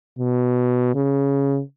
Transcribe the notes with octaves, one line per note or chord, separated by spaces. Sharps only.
B2
C#3